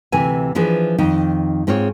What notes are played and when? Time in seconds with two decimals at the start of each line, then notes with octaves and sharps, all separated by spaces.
0.12 D2 C3 E3 G#5
0.55 E3 F3 D4 G#4 B4
0.98 F2 D#3 D#4
1.67 G#2 C4 F4 G#4 C#5